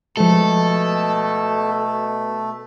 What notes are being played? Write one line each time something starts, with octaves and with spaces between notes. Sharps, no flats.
B2 F3 G#3 A3 A4